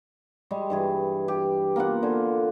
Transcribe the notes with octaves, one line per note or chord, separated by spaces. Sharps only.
G3 G#3 C#6
G2 E3 G#4
G4
A#3 B3 F4 F#5
D3 C5 G#5